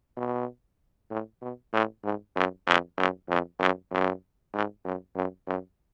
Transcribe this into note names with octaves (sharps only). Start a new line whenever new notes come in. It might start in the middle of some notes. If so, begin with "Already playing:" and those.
B2
A2
B2
A2
G#2
F#2
F2
F#2
F2
F#2
F#2
G#2
F#2
F#2
F#2